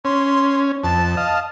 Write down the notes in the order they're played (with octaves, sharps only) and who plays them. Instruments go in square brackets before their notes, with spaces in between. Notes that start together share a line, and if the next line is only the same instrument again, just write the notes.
[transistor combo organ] C#4 [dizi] C6
[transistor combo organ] F2 [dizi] A5
[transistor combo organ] D#5 F5